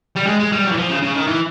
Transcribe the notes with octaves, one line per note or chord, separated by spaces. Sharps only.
G3
G#3
G#3
G3
F#3
E3
F3
C#3
C#3
D#3
E3